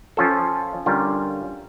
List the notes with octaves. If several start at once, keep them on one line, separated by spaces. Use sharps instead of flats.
F3 C#4 F4 A4
D3 G3 C#4 F4 A#4